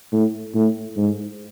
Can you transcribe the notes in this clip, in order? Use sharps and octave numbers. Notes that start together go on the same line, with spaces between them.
A2
A2
G#2